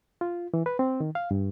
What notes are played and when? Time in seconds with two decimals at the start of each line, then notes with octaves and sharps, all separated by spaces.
0.21 F4
0.54 E3
0.66 B4
0.79 C4
1.00 D#3
1.15 F5
1.31 G2